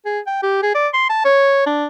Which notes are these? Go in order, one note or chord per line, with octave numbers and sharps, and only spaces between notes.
G#4
G5
G4
G#4
D5
C6
A5
C#5
D4